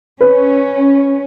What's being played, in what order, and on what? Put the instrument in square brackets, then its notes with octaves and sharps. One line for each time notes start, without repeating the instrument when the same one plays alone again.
[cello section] C#4 [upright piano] B4